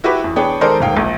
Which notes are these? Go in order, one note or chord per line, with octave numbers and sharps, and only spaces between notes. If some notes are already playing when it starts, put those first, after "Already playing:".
E4 F#4 G4 B4
E2
B3 D4 G#4 C#5 G5
D#3 G#3 A4 A#4 C5 D5
D#1 G#2 F5 G5
A#1